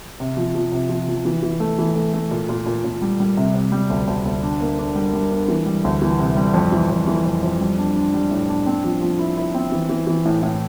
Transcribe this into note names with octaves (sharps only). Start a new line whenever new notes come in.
C3
F3
F3
C3
F3
F3
E3
E3
A3
E3
A3
A3
A#2
A#2
A#2
A#2
G3
G3
C3
C3
G3
D2
D2
D2
D4
A#3
D4
G3
G3
D4
E3
G3
D2
E3
C3
G3
F2
E3
F2
E3
F2
F2
G3
D4
D4
G3
A2
D4
C4
F3
F3
E4
E4
C4
E3
E3
E3
A2
A2